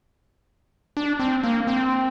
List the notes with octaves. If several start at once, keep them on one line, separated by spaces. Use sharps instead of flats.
D4
C4
A#3
C4